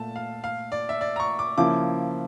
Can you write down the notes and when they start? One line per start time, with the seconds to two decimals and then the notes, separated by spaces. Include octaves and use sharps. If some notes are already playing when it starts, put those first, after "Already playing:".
Already playing: A#2 A3 A5
0.16 F5
0.44 F5
0.72 D5
0.89 E5
1.01 D5
1.16 A#5
1.20 C#6
1.39 D6
1.57 C#3 F3 A#3 E4 D6